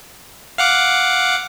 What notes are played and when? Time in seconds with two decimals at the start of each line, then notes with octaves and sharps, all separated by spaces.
0.58 F5 F#5 D6